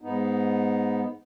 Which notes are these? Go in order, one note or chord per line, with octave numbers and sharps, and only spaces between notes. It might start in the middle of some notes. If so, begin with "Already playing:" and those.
G#2 B3 D#4